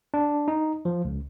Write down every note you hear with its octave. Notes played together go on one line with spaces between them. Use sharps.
D4
D#4
F3
C#2